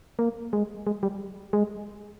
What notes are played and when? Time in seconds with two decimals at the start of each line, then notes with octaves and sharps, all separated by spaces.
0.19 A#3
0.53 G#3
0.87 G#3
1.03 G3
1.53 G#3